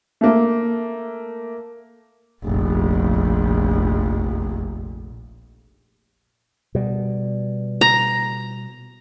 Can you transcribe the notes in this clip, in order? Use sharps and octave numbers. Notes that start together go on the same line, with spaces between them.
A3 A#3
F1 A#1
B2 G3
A#5